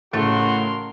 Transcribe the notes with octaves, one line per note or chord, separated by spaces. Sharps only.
A1 A2 C#3 A3 F#4 A#4 C#5 C6